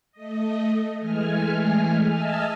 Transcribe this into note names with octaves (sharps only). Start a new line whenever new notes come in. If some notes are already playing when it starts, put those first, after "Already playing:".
A3 D#5
E3 G#3 A3 G#5 F6
D#5 E5 G#5 A5 E6 F6